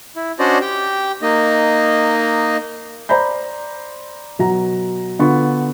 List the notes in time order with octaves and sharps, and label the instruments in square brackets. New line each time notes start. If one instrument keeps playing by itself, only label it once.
[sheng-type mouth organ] E4
C#4 D4 F#4 C5 D5 D#5
G4 G5
A#3 D#4 D#5
[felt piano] C5 D5 A#5 B5 G6
B2 F#3 F#4 A#5
D3 B3 F4 C#6